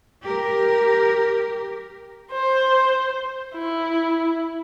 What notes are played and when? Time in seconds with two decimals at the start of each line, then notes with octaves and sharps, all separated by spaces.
0.22 G4 A#4
2.32 C5
3.55 E4